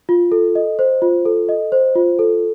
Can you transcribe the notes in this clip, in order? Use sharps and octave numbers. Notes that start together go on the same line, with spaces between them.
F4
A4
D#5
C5
F4
A4
D#5
C5
F4
A4